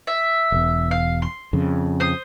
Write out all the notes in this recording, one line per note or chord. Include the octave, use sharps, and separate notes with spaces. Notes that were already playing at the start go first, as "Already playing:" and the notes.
E5
E1 E2
F5
C6
F2 C#3
C5 D#6